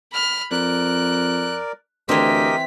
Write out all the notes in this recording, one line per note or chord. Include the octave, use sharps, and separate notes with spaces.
B5 F6
F2 A#4 D5 F#6
D2 E3 C4 G4 A#4 D#5 B6